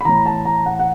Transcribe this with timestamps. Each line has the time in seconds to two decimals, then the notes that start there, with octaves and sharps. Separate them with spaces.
0.01 B5
0.05 A2 E3 A#5
0.26 A5
0.45 A#5
0.66 F#5
0.79 F#5